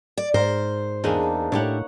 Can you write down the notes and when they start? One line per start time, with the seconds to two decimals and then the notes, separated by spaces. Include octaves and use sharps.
0.18 D5
0.34 G#2 A#4 C5
1.04 E2 A#3 D4 D#4 G#4
1.52 A2 D4 E4 G4 C#5 F#5